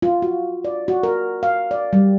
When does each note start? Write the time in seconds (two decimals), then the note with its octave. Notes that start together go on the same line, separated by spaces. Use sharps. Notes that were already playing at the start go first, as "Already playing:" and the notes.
0.02 F4
0.22 F#4
0.65 D5
0.88 F#4
1.03 A#4
1.43 F5
1.71 D5
1.93 G3